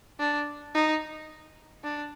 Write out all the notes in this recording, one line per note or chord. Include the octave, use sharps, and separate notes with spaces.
D4
D#4
D4